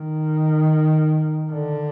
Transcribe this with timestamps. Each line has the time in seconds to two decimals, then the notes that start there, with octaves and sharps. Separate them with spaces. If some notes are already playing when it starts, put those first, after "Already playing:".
Already playing: D#3
1.52 D3